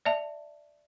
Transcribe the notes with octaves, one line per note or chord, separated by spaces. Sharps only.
D5 E5 A5